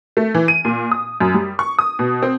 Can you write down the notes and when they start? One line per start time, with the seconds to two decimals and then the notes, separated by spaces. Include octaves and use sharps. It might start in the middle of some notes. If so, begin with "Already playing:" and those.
0.17 A3
0.35 E3
0.48 D#7
0.65 A#2
0.91 D#6
1.20 F#2
1.34 G3
1.59 C#6
1.79 D#6
1.99 B2
2.22 C4